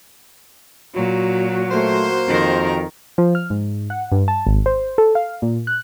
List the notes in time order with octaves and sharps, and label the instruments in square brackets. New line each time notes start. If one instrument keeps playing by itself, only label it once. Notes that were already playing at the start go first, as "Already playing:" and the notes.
[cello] A#2 F#3 [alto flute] F#4
[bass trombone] A3 [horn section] A#3 C5
[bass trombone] F2 [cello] D#3 A#4
[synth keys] F3
F6
G#2
F#5
G2
A5
G#1
C5
A4
F5
A#2
F#6